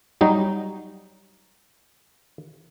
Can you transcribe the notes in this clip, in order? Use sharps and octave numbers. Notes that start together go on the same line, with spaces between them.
F#3 G3 D#4